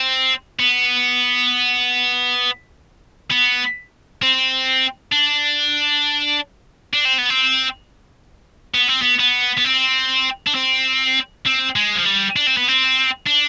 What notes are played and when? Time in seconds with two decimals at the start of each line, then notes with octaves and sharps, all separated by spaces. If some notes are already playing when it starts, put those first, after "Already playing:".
Already playing: C4
0.60 B3
3.31 B3
4.22 C4
5.12 D4
6.93 D4
7.05 C4
7.18 B3
7.30 C4
8.74 B3
8.88 C4
9.02 B3
9.19 B3
9.57 B3
9.64 C4
10.47 D4
10.55 C4
11.46 C4
11.76 G#3
11.96 F3
12.05 G3
12.36 D4
12.47 C4
12.57 B3
12.68 C4
13.27 D4